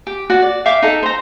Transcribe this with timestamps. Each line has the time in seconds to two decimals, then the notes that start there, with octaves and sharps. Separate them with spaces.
0.07 G4
0.30 F#4 D5
0.42 D5
0.66 E5 F5 G5 D6
0.82 D#4 A4
1.03 C5 A#5